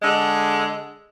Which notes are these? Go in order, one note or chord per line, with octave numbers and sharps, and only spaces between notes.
D3 G#3